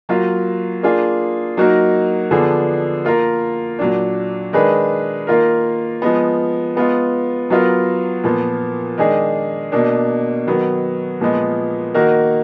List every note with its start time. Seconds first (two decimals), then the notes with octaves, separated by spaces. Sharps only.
0.09 F#3 A#3 F4
0.83 A#3 D4 F4 G#4
1.57 F#3 A#3 D#4 F#4 A#4
2.31 D3 F3 B3 D4 G#4
3.05 A#3 F4 A#4
3.79 A#2 F#3 D4
4.53 D#3 G#3 D4 G#4 B4
5.27 D#3 A#3 F4 A#4
6.02 F3 G#3 B3
6.75 G#3 B3 F4
7.50 F#3 B3 F4 A#4
8.24 A#2 F3 B3
8.98 D#3 G#3 D4 G#4
9.72 B2 A#3 D4
10.47 D#3 F#3 B3
11.21 A#2 F3 G#3 B3
11.94 D#3 A#3 D#4 F#4 A#4